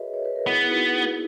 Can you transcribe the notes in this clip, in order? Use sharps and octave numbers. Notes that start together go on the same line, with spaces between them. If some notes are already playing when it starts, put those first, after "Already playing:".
Already playing: F#4 G#4 A#4 B4 C#5 D#5 E5
C#5
B4
A#4
B3 E4 G#4
E4
D#4 F#4
E4